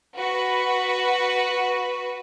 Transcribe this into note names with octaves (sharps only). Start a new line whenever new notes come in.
F#4 B4